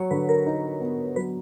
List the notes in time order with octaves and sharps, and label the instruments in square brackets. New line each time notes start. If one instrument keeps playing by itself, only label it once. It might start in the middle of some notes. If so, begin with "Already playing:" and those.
Already playing: [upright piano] F#3 [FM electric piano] C#5
[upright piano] D3 [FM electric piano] B4
[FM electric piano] A#4
[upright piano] D#4
B3
[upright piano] F#3 [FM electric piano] B4